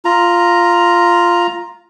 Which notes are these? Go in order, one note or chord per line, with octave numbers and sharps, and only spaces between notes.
F4 A#5